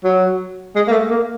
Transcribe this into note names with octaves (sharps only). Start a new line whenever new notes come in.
F#3
G#3
A#3
A3
A#3